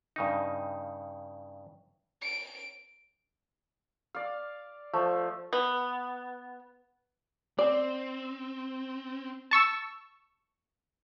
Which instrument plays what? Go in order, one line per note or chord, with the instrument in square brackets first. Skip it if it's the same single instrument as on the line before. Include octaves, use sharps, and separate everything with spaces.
[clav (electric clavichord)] G2 C#3 D#4
[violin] D7
[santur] D5 F5
F3 A3
[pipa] B3
[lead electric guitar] C4 [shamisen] D5
[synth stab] A5 C#6 E6